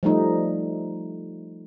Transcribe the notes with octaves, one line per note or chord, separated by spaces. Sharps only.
F3 G3 A3 D#4